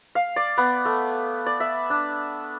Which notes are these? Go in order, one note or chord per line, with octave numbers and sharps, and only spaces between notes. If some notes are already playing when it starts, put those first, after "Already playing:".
F5
D5
B3
A3
D5
E5
D4